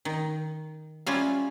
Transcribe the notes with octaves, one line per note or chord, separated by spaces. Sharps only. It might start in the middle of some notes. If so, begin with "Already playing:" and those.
D#3
G3 C#4 F4 E5 F5